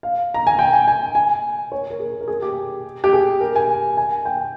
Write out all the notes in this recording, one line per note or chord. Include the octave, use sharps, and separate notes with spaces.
F5
A#5
G#5
G5
G#5
G#5
G#5
C#5
A#4
G#4
A#4
G#4
G4
G4
G#4
A#4
G#5
G#5
G5